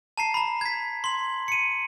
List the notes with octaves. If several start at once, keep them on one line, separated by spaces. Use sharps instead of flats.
A5 A#5 C7
A#5 B5
G#6 B6
C6 F#7
C#7 D#7